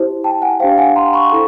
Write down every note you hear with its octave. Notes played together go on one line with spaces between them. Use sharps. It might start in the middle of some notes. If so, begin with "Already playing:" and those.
Already playing: E4 G4 C5
G5 A5
F#5 G#5
D4 G4 C5 F5 G5
F#5 G#5
A#5 C6
B5 C#6
E4 A4